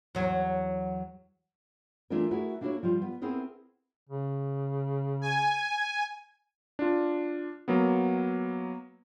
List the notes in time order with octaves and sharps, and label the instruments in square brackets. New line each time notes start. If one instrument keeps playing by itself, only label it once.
[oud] E2 F#3
[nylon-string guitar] E3 A3 D4 F4 G#4 A#4
A3 E4 F#4 G#4 A#4
A#3 D4 E4 F#4 A4 C#5
F3 G3 F4
B3
B3 C4 E4 G#4 A#4
[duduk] C#3
[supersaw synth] G#5
[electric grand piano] D4 F4
F#3 A#3 B3